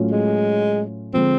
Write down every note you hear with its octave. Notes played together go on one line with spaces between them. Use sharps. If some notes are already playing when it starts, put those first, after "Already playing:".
Already playing: A2 F#3 A3 C#4 F4
G#3
D3 F3 G#3 C4